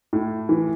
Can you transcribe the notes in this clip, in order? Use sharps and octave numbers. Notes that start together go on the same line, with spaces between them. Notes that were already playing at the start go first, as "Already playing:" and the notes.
A2
E3